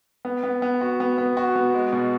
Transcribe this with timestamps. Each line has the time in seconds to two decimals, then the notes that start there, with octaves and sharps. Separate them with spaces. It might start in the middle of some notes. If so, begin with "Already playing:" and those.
0.25 B3
0.44 B3
0.62 B3
0.81 F#4
1.00 B3
1.18 B3
1.37 F#4
1.56 B3
1.74 G#3
1.93 B2